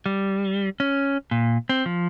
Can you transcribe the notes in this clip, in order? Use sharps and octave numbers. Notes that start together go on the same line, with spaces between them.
G3
C#4
A#2
C4
F3